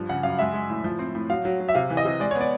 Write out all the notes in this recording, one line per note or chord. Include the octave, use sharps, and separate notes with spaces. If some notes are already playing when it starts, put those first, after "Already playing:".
Already playing: G2 F3
C#3 F#5
F#2 F5
G#3 E5
G#3
A2
F3
C4
A2
F#3 F5
F#3
F#3
E5
C3 F5
E3
D#5
C3
G#3 D5
B3 C#5
D5